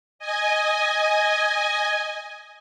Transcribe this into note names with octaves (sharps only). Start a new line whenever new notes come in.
D#5 G#5